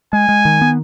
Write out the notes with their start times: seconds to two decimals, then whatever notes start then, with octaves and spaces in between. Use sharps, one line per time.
0.13 G#3 G#5
0.29 G#3
0.45 D#3
0.61 B3